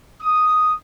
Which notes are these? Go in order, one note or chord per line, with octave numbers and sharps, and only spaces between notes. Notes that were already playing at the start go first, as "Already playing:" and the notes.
D#6